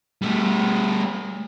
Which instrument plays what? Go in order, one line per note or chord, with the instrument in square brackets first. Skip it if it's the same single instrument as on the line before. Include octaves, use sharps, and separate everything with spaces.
[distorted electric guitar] G3 A3